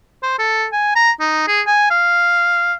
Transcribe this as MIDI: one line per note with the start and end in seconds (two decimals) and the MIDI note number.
0.23 0.38 72
0.39 0.66 69
0.73 0.92 80
0.96 1.11 82
1.20 1.46 63
1.48 1.62 68
1.67 1.86 80
1.90 2.73 77